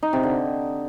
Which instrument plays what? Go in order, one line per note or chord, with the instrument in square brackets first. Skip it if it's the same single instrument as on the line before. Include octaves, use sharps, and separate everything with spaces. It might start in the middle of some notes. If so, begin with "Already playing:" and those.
[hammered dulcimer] D#4
C3
D3